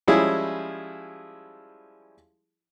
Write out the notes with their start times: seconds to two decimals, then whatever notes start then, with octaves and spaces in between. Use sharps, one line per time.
0.07 F3 G3 G#3 C#4 E4 G#4